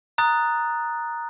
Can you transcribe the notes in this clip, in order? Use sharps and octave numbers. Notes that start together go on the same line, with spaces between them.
A#5 D#6 F#6 A6